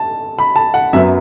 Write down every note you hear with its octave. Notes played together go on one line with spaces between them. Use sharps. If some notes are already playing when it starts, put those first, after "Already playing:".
Already playing: A5
B5
A5
F#5
F#2 F#3 B3 E5